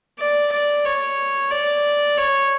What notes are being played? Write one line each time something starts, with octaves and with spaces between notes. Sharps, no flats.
D5
D5
C#5
D5
C#5